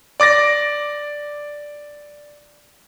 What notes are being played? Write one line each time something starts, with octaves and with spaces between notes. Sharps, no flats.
D5 D6 A6 A#6